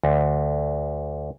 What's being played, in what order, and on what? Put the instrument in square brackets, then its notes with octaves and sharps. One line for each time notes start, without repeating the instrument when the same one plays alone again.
[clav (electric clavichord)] D2